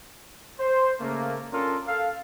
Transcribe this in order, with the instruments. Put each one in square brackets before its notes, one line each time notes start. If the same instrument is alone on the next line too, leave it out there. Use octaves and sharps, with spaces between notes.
[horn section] C5
C#3 A3 A#3
C#4 D4 F4 A4 A#4
A4 F5